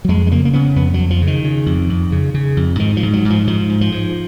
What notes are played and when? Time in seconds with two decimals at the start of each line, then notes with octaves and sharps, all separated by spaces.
0.05 F#3
0.08 F2 G#3
0.27 G#3
0.32 C#3 A#3
0.45 A#3
0.53 C#3 B3
0.76 F2 B3
0.94 F#3
0.99 F2
1.10 F3
1.22 C#3
1.27 D#3
1.44 C#3
1.66 F2
1.90 F2
2.12 C#3
2.34 C#3
2.57 F2
2.79 G#2 D#3
2.97 F3
3.03 G#2
3.13 F#3
3.25 G#2
3.30 F3
3.47 G#2 F3
3.69 G#2
3.81 F3
3.92 G#2